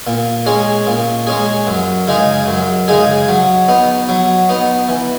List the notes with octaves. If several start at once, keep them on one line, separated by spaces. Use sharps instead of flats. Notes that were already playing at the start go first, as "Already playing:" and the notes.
A#2
G#3 C#4 G#4
A#2
G#3 C#4 G#4
F#2
C#3 G#3 D#4 G#4
F#2
C#3 G#3 D#4 G#4
F#3
B3 D#4
F#3
B3 D#4
E3